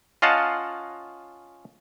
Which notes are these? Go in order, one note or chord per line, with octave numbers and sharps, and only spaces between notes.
C#4 F4 D#5 F5 F#5 A5